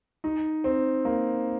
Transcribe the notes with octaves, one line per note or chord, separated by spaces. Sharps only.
D#4
C4
A#3